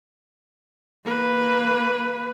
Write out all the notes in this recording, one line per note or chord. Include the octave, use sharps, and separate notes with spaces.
A#3 B4